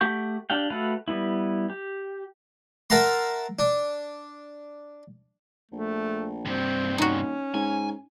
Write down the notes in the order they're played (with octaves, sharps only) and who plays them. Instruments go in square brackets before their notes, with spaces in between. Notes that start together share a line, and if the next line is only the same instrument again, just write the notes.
[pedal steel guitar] A3 G4 F#5 C#6 G6
D4 G4 F5 G5
A3 F#4 A4 B4 F5
G3 B3 E4
G4
[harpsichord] A#4 E5 F#5 A5 A#5 C6
D4
[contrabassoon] A#1 [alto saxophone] A3
[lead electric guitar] G2 C3 [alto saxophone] C4
[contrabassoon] D#1
[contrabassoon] D#2 [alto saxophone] C#4 [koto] D#4 F#4
[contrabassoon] G#2 [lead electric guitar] G#5